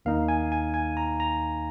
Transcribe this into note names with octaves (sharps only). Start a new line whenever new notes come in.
D#2 D#3 A#3 D#4 F5
G#5
G#5
G#5
A#5
A#5